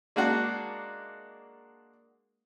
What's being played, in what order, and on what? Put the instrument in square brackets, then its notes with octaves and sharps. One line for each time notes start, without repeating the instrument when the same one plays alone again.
[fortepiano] G#3 A#3 D4 F#4